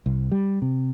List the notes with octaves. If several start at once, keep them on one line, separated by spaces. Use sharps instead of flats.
C2
G3
C3